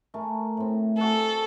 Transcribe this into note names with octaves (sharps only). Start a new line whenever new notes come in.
A3 G#4 A#4
A2 C4
F#4 G#4 A4